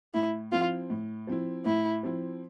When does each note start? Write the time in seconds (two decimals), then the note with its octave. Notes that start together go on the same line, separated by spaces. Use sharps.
0.14 A2 E4
0.52 F3 C4 E4 F4
0.90 A2
1.27 F3 C4 E4
1.65 A2 E4
2.03 F3 C4 E4